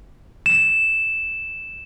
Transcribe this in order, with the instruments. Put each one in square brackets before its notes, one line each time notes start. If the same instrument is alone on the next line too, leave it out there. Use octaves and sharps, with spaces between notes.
[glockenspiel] E7